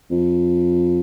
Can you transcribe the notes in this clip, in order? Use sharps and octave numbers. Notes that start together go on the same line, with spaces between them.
F2